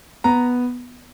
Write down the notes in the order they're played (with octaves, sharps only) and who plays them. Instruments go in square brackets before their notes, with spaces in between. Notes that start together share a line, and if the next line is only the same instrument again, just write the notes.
[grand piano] B3 A#5